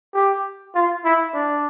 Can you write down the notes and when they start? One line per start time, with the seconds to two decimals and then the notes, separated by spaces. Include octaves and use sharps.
0.14 G4
0.75 F4
1.05 E4
1.34 D4